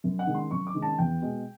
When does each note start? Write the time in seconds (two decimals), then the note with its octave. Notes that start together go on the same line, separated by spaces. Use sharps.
0.04 F#2
0.19 F#5
0.27 D#3 G#3 C#4
0.34 C6
0.51 F#2 C#6
0.67 D6
0.74 D#3 G#3 C#4
0.82 A5
0.98 E2 G5
1.22 B2 G#3